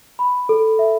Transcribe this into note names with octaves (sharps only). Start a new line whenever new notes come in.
B5
A4
E5